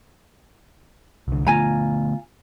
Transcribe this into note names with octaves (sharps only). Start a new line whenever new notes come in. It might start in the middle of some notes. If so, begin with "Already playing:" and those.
C2 D3
D3 A3 B3 F4 G#5 A#5